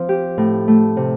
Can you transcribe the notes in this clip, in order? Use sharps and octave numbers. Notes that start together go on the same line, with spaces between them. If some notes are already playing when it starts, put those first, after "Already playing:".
Already playing: F3 C4
G4
A2
A3
C3